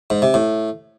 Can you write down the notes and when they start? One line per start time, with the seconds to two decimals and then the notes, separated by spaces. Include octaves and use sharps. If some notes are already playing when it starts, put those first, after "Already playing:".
0.10 G#2
0.22 C3
0.34 A2